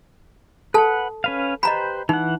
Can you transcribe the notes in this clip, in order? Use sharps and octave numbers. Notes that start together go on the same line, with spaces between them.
A4 B4 F#5 A5
C#4 B4 F5
G4 B4 C5 D#5 A#5 B5
E3 D#4 F#5